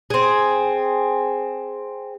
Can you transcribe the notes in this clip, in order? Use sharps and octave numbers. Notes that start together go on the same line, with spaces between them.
C4 G#4